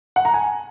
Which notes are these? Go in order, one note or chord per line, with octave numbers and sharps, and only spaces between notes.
F#5
A#5
G#5